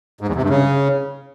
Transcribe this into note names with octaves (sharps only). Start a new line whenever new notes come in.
G#2
E2
C3
G2
C#3